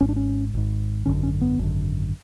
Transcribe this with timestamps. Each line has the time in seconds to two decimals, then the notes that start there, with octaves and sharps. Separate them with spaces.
0.01 G#1 G#2 C#4
0.09 D4
0.16 C#4
0.54 G#1 G#2
1.06 G#1 F#2 D3 C#4
1.23 C#4
1.41 B3
1.58 G#1 F#2 D3